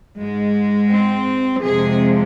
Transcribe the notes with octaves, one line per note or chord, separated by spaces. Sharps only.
G#2 G#3
C4
F2 C3 F3 G#3 G#4